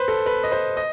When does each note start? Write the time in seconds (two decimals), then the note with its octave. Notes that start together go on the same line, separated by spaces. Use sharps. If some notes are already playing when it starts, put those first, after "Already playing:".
Already playing: B4 C5
0.08 A4
0.26 B4
0.43 D#5
0.52 C5
0.77 D#5